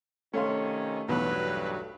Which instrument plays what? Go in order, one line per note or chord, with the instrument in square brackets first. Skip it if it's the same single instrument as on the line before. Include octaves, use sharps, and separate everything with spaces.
[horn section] C3 D#3 C#4 [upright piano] A3 F5 [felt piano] C#5 C6
[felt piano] B1 E2 [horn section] G2 F#3 [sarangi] B4